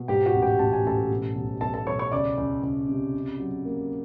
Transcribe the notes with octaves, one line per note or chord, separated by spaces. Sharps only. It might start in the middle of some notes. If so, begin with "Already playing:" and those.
Already playing: B2
G#2 G4 G5
F#4 F#5
A1
G4 G5
A1 A5
G#5
A1 A4 A5
B2
B1
B1 A4 A5
A4 A5
B1 C#5 C#6
C#5 C#6
C#2 D5 D6
C#2
C#2
C3
C#3
F#3
A#3